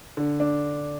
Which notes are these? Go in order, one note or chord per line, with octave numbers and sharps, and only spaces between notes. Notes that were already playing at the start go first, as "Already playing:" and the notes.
D3
D4